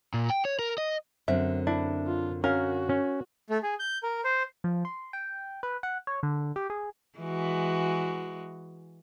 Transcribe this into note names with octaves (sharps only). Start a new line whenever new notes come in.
A#2
G5
C#5
A#4
D#5
F#2 D3 C4 E5
D4 E4
F4
C#4 F#4 A#4 F5
C#4
A3
G#4
G6
A#4
C5
F3
C6
G5
B4
F#5
C#5
D3
G4
G#4
E3 G#3 F#4